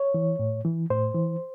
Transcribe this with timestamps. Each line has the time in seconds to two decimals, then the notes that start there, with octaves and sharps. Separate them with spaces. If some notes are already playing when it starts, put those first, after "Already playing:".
Already playing: C#5
0.14 E3
0.39 A2
0.65 E3
0.90 A2 C5
1.15 E3